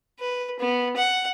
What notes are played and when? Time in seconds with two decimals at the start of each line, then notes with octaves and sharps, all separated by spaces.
0.20 B4
0.59 B3
0.96 F#5